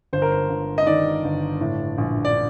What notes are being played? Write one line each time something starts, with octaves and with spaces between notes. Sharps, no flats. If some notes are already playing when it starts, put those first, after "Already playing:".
G1 C5
A#4
C5
G1
D#5
D#3 D5
G1
A2
A#1
D5